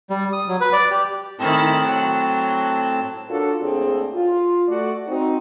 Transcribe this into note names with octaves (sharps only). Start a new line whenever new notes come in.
G3
D#6
F#3
B4
D5
G4
A2 D#3 C4 E4 A5
F#3
D4 F4 F#4 A4 A#4 C#5
A2 D3 A#3 C4 G#4
F4
A3 F#4 D5
C4 D#4 F#4